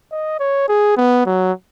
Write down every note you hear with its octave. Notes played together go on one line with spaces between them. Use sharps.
D#5
C#5
G#4
B3
F#3